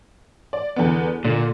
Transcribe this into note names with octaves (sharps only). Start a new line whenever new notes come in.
D5
E2 D3 B3
A#2 D3